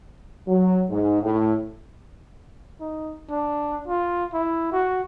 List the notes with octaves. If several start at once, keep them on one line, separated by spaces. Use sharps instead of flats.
F#3
G#2
A2
D#4
D4
F4
E4
F#4